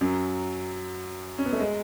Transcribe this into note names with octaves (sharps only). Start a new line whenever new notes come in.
F#2 F#3
C#4
B3
A3
G#3